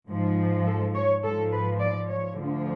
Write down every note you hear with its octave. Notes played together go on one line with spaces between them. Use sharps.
G#2 F3
A4
C#5
G#2 F3 A4
B4
D5
C#5
D2 D3 F3